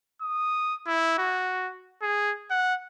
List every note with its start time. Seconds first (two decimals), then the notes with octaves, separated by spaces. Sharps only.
0.22 D#6
0.87 E4
1.18 F#4
2.02 G#4
2.51 F#5